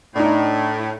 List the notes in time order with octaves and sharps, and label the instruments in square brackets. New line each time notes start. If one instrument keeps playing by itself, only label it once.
[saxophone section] A2 [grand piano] D4 D#4